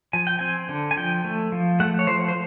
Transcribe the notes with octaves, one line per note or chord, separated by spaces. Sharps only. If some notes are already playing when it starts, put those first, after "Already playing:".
F3 G#5
G5
C4 G#5
D3
G#5
F3 G5
A3
F3
A3 F#5
C#5
F3 C5
C5